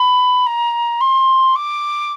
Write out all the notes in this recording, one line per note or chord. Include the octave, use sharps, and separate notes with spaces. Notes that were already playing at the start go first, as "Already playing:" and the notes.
Already playing: B5
A#5
C6
D6